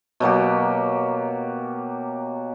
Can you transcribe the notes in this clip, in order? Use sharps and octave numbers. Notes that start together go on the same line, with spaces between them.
B2 F#3 A#3 G4